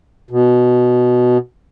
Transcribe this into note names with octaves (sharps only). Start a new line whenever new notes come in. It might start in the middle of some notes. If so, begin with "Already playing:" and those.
B2